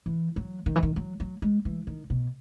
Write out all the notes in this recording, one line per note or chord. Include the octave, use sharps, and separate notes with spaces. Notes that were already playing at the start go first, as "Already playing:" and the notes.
E3
F#3
D#3
E3
D#3
F#3
F#3
G#3
E3
D#3
B2